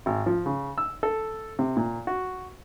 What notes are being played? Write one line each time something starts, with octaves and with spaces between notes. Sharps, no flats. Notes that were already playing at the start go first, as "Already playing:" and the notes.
G#1
F3
C#3
E6
A4
C3
A#2
F#4